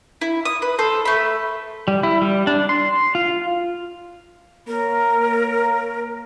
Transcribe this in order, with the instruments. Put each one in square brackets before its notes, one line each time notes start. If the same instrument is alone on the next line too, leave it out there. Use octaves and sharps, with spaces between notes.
[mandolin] E4
D#6
B4
A4 C5
A3 B5
[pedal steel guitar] G3
E4
G3
D4
C6
F4
[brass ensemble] A#3 C#5 A#5 [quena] A#4